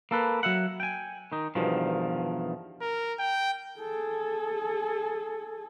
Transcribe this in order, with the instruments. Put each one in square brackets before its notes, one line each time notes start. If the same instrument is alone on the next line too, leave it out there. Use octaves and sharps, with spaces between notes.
[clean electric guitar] A#3 A4 B4
F#3 E5 F#5
G5 G#5
D#3 D#4
E2 G2 B2 D#3 F3
[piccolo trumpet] A#4
G5
[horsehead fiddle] G#4 A4